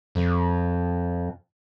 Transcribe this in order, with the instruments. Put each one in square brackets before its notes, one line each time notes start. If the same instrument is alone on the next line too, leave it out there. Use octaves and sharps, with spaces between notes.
[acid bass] F2